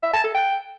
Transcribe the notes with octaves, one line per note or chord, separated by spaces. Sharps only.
E5
A5
A4
G5